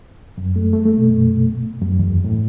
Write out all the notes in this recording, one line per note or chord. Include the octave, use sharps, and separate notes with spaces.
F#2
A3
A3
A3
B2
F#2
F#2
E2
A2